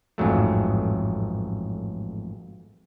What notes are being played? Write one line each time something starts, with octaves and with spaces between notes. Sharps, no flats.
A1 F2 G#2 F#3 A3